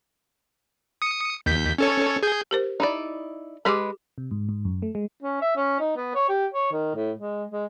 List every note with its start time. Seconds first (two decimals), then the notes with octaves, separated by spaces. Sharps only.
1.02 D#6 C#7
1.46 D#2 G6 B6
1.78 C#4 A4 C#5
2.23 G#4 G6
2.51 G4 A#4 C5
2.80 D#4 E4 D5
3.65 G#3 G4 G#4 B4 B5 D6
4.18 C3
4.31 G#2
4.49 G#2
4.65 F#2
4.82 A3
4.95 G#3
5.22 C#4
5.42 E5
5.57 C#4
5.80 D#4
5.97 B3
6.15 C#5
6.29 G4
6.54 C#5
6.72 D#3
6.95 A2
7.19 G#3
7.51 G#3